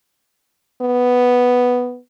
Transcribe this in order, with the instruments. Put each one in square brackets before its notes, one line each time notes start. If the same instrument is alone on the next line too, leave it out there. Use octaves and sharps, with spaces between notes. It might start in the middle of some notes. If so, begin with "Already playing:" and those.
[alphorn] B3